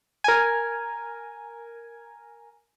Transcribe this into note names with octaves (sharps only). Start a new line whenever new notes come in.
A#4 G#5